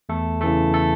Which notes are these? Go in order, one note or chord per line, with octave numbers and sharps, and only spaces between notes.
E2 A3 A4
C#3 E3 A3 A4
A3 A4